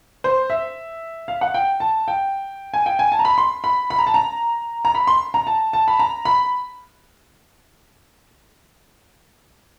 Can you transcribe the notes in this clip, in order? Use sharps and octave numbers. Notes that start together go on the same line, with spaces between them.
C5
E5
F5
F#5
G5
A5
G5
G#5
G5
G#5
A5
A#5
B5
C6
B5
B5
A#5
A5
A#5
A#5
B5
C6
A#5
A5
A5
B5
A#5
B5